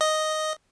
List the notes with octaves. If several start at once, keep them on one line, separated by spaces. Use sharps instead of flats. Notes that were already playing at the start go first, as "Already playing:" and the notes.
D#5